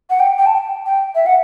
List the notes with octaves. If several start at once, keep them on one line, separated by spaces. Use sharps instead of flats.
F#5
G5
G5
A5
G5
E5
F#5